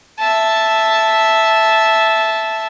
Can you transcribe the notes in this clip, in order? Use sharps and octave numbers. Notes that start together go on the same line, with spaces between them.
E5 A5